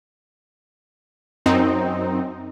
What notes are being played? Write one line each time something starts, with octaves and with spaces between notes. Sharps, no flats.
F#2 C4 D#4